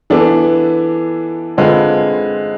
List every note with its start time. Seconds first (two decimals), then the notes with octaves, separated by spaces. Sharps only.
0.10 E3 B3 D4 A4
1.58 D3 G#3 C4 F4 B4